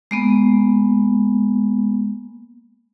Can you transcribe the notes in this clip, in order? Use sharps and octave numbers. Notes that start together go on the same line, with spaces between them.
G#3 A#3 B3